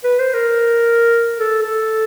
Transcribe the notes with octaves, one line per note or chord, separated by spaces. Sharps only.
B4
C5
A#4
A4
A4